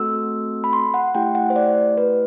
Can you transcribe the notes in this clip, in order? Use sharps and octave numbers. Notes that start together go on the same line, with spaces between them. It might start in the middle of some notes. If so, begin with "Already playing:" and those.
Already playing: A3 C4 F#4 A4 E6
B5
C6
F#5
A3 E4 G4 G5
F#5
C5
D5
B4